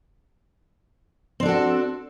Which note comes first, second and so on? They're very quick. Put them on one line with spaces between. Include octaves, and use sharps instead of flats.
C4 D4 A4 F#4